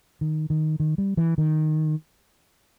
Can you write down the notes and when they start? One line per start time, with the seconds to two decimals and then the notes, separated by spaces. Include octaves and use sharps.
0.21 D#3
0.50 D#3
0.80 D#3
0.98 G3
1.17 E3
1.38 D#3